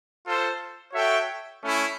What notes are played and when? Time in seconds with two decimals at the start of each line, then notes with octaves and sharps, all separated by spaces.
0.25 F4 A4 C5
0.93 F#4 A4 C#5 E5 G5
1.62 A3 C#4 E4